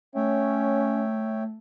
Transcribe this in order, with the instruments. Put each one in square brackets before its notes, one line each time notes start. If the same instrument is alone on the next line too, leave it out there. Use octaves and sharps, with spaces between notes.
[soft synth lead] A3 [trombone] C#4 [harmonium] C#5 E5 G5